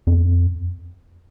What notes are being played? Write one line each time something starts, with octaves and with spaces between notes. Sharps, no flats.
F2